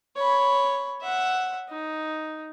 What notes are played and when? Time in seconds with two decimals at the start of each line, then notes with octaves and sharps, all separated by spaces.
0.16 C#5 B5
1.01 E5 F#5
1.69 D#4